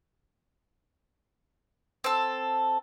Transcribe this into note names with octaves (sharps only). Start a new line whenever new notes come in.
C4 A4